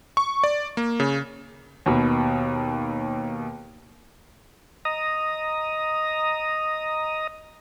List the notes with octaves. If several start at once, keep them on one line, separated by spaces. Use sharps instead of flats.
C#6
D5
A#3
C#3
D#2 B2
D#5 A#5 D#6